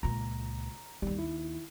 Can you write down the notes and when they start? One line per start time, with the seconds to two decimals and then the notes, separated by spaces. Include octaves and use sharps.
0.03 C#2 A#2 A#5
1.02 A1 D#2 D#3 G3
1.19 E4